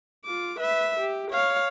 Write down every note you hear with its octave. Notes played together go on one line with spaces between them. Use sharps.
F4 D6
B4 E5
G4
C#5 F5